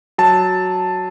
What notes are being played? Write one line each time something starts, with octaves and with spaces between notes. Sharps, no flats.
F#3 A5